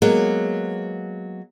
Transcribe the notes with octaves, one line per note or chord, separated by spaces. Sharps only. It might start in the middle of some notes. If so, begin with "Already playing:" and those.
F#3 G#3 A#3 B3